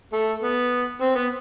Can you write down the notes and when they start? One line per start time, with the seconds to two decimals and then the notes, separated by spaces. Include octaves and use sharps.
0.13 A3
0.42 B3
1.01 C4
1.15 B3